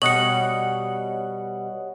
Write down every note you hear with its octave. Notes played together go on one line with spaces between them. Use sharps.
B2 G3 C#5 D#5 F#5 C#7 F#7